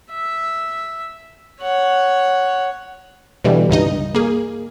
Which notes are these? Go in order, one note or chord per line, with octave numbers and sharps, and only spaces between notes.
E5
C#5 F#5
B2 D3 E3 G3
C#2 G2 D#4 D#5
A#3 G#4